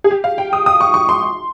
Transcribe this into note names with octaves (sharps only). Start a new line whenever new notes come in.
G#4
G4
F5
G5
D#6
D#6
C#6
C#6
C6